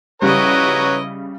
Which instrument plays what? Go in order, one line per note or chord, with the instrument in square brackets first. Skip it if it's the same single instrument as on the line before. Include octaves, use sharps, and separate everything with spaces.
[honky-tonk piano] C#3 G3 [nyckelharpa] E4 D#5 [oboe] F#4 [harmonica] B4 C#5 A#5